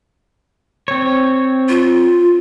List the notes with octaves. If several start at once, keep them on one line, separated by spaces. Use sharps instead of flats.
C4 C#5
F4